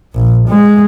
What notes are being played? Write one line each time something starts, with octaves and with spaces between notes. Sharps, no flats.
A#1
G#3